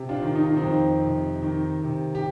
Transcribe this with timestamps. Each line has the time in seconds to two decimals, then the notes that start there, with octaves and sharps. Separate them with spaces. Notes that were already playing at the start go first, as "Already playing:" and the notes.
Already playing: C3
0.09 D4 F4
0.22 D#3
0.35 D#4
0.46 F4
0.56 C4 D#4
0.63 F2
1.03 C3
1.42 D#3
1.82 C3
2.15 G4